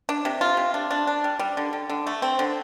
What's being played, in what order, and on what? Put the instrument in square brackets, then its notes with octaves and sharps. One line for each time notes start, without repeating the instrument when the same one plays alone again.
[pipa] D4
C3
F4
C3
D4
D4
D4
G3
G3
D3
D3
D3
A3
C4
D3